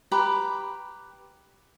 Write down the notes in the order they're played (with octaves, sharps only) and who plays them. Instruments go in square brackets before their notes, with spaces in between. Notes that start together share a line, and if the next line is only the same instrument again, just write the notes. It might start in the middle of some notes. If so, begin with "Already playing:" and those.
[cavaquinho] G4 B4 A#5 B5